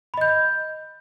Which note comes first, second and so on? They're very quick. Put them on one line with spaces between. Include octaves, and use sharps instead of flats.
B5 D#5 G6